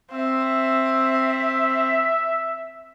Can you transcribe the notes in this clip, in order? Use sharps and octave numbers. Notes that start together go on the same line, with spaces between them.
C4 E5